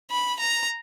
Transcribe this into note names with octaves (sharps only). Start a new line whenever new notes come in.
B5
A#5